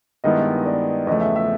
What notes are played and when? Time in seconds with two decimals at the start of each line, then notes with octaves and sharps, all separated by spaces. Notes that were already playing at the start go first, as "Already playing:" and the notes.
0.24 G2 D#3 G#3 B3 E4 D#5
0.66 D5
1.07 E2 C#3 F3 A3 D#5
1.21 E5
1.36 E5